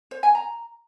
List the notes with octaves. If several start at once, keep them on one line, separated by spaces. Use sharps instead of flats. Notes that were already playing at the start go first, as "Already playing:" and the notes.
C5
G#5
A#5